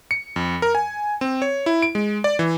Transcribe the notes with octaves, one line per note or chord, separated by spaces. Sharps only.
C#7
F2
A#4
G#5
C4
C#5
E4
D7
G#3
D5
E3